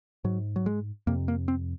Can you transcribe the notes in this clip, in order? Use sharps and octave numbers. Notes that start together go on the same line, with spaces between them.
G#2 F#3
F#3
G#3
F2 C3 A#3
A#3
C4